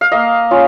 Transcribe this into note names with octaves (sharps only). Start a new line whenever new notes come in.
F5
A#3 D#5
C#4 F4